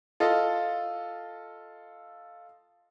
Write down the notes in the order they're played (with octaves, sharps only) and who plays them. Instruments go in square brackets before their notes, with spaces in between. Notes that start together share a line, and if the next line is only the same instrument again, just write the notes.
[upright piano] F4 A4 D#5